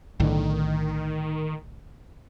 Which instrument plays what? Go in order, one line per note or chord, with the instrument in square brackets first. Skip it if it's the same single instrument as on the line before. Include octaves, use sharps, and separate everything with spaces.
[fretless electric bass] B1 A2 D3 [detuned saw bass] D#3